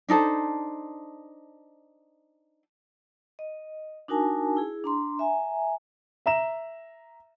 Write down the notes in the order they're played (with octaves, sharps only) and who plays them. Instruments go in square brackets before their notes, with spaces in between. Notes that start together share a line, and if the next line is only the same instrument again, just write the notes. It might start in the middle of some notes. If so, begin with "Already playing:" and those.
[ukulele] D4 D#4 A4 C5
[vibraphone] D#5
D4 D#4 F#4 A#4 G#5 A5
E4 G#4
D4 A#5 C6
E5 G#5 A#5
[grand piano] E5 A#5 E7